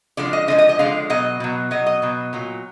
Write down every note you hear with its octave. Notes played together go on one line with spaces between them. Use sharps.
D3 F3 G#3 D5
D#5
D3 F3 G#3 D#5
D#5
D#5
D3 F3 G#3 F5
B2 F#3 D#5
B2 F#3
B2 F#3 D#5
D#5
B2 F#3
A#2 F#3